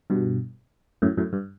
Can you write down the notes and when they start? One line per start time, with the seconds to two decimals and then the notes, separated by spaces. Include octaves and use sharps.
0.10 G2 B2
1.02 F#2 A2
1.17 F#2 A2
1.33 G2